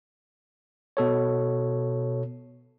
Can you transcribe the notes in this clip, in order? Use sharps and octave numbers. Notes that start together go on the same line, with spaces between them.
B2 A4 C#5